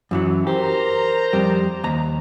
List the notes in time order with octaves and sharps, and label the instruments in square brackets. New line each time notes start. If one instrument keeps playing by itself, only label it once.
[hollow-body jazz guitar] F#2 E3 F#3
[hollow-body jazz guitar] G4 [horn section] A#4 C5 A#5
[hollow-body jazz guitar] F2 G3
D#2 A#5